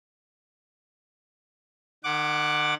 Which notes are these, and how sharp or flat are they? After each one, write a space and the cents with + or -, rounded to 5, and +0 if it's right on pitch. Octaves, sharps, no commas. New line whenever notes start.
D#3 -40 F#5 +0 D6 +0